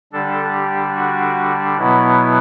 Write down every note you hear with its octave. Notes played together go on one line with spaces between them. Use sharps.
D3 G3 D4 A4
G4
F#4
B2 F#3 B3 E4